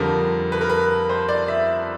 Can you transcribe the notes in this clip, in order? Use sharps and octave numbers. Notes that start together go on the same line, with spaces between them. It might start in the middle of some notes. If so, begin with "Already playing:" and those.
Already playing: F2 D3 G3 A#4
B4
A#4
B4
C5
D5
E5